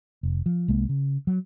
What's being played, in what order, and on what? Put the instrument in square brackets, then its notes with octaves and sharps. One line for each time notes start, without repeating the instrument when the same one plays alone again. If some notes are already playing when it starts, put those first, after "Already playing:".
[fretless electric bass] F1
F3
C2 G#3 A#3
C#3
F#3